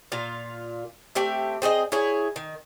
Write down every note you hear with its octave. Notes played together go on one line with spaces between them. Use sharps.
A#2 F4 F5
A3 C4 G4 E5
C4 G#4 C5 D#5
E4 G#4 C#5
D#3